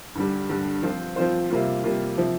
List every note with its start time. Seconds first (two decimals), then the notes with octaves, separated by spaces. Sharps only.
0.15 G2 D3 G3
0.49 G2 D3 G3
0.83 F3 C4 F4 C5
1.16 F3 C4 F4 C5
1.50 C3 G3 A#3 F4
1.84 C3 G3 A#3 F4
2.17 C3 F3